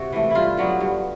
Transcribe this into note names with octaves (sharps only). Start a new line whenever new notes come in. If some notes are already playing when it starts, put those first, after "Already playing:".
Already playing: C3 F#4
E3 A3
G2 E4 F4
D3 F#3 B3
G2